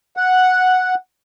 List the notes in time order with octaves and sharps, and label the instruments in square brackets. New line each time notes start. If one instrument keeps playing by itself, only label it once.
[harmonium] F#5